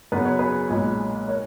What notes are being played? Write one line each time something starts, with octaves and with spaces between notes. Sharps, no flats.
F#2 C#3 F#3 B3 B4
C#5
G#4 B4
B1 A#2 G#3
A#4 C#5